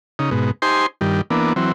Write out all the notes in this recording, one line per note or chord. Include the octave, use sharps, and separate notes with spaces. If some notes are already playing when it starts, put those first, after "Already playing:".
C#3 D#4
G#2 B2
D#4 G4 C5 G#5 C6
G2 D#3 G3
E3 A#3 B3 D4
E3 F#3 C4